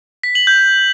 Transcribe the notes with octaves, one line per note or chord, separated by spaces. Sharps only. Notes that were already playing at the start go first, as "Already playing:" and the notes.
B6
F#7
G6